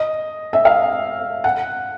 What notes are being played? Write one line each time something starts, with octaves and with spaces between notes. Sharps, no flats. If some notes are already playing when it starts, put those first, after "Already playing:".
Already playing: D#5
E5
F5
F#5